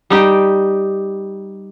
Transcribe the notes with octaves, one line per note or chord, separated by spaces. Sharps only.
G3 D#4 G4